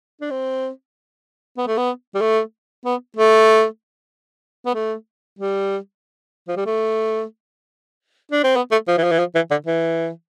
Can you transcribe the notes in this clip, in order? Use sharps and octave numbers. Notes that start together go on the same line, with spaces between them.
D4
C4
B3
A3
B3
G3
A3
B3
A3
B3
A3
G3
F3
G3
A3
D4
C4
B3
A3
F3
E3
F3
E3
F3
E3
D3
E3